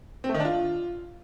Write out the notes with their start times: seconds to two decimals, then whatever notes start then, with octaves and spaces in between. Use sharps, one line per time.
0.24 C4
0.29 A3
0.34 D#3
0.40 D4
0.45 F4